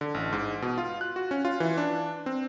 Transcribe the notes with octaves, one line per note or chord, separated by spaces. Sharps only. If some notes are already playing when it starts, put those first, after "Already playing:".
D3
A1
G#2
B2
F4
F#6
F#4
C#4
F4
E3
D4
C4